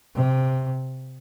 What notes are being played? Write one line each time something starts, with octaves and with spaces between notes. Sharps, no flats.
C3